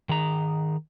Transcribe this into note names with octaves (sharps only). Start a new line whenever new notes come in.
D#3 G#4 A#5